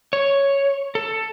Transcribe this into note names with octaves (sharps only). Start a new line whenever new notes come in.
C#5
A4